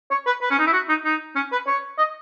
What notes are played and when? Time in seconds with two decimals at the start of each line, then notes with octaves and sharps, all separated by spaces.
0.11 C#5
0.26 B4
0.41 B4
0.51 C#4
0.59 D#4
0.66 E4
0.73 F#4
0.89 D#4
1.05 D#4
1.36 C#4
1.52 B4
1.67 C#5
1.99 D#5